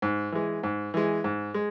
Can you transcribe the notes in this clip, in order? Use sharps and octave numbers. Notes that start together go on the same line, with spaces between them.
G#2
E3 G#3
G#2
E3 G#3
G#2
G#3